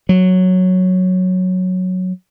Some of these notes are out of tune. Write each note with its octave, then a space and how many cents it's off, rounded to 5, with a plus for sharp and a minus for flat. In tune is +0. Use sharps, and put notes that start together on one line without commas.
F#3 -5